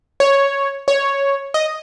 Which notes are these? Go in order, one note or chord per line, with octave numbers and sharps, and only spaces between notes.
C#5
C#5
D#5